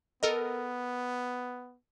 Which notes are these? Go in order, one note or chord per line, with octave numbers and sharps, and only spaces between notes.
B3 A4 A#4 D#5